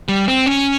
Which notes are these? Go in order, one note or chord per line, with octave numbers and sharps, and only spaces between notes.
G3
C4
C#4